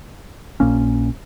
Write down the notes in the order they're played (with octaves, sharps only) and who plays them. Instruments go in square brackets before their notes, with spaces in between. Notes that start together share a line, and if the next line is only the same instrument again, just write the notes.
[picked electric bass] A#1 A#2 A#3 C#4